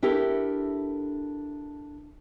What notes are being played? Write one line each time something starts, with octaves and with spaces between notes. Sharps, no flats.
D4 E4 G4 A4 A#4